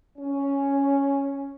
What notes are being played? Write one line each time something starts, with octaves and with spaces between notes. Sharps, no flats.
C#4